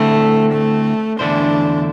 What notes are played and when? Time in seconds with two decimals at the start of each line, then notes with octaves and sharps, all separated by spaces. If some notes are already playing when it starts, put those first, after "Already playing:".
Already playing: D2 D3 A3 C4 E4 A4
0.52 A3
1.19 E2 D3 A3 D4 E4 C5